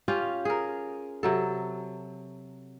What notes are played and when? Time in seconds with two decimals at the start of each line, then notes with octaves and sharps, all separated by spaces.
0.08 C#4 F4 G4 F5
0.45 G#4 A#4
1.23 C3 F#3 A4